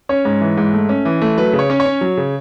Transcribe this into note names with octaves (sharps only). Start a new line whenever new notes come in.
C#4 C#5
G#2
E3
G#2
A3
C#4
E3
A3
F#3 B4
C#3
C#5
C#4
C#5
C#4
F#3
C#3